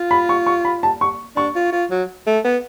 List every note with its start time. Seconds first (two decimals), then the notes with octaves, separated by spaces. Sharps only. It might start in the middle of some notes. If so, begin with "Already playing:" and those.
Already playing: F4
0.11 B5
0.29 C#6
0.47 C#6
0.65 B5
0.83 A5
1.01 C#6
1.36 D4 C#6
1.55 F4
1.72 F4
1.90 F#3
2.27 A3
2.44 B3